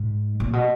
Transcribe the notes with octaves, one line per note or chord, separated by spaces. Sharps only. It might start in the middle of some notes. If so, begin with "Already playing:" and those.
Already playing: G#2
A#2
B2